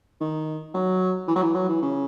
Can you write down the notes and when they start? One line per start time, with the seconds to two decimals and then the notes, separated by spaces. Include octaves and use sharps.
0.21 D#3
0.74 F#3
1.28 E3
1.36 F#3
1.42 E3
1.55 F#3
1.69 E3
1.82 C#3